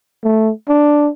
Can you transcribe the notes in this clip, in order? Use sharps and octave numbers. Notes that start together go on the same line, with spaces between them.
A3
D4